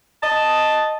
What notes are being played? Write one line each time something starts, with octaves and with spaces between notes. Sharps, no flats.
D#5 A5